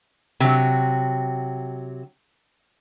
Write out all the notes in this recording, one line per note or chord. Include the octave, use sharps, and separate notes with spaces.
C3 F#3